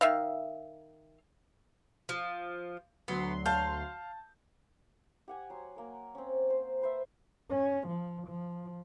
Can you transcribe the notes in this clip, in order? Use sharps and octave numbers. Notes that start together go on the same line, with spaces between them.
D#3 E5 F5
F3
D2 F#3 B3 C6
F5 A5 G6
G4 F#5 G#5
F#3 C6
A#3 A#4
C4 C#4
C5
B4 C5 E5
C#4
F3
F3